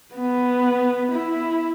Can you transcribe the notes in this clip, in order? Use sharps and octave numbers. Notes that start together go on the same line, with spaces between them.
B3
E4